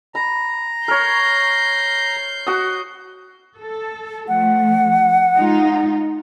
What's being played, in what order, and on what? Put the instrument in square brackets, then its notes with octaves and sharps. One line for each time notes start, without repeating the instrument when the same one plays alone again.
[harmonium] A#5 [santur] B5
[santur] A#4 C#5 [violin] G6 C7
[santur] F#4 F#5 D#6
[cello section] A4
[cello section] F3 A3 [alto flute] F#5
[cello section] G#3 D#4 F4